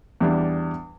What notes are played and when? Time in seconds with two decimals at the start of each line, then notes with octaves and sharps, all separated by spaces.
0.21 E2 G3 D4